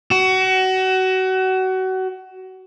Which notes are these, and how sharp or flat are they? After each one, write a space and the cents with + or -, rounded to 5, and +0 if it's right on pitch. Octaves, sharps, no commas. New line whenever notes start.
F#4 +25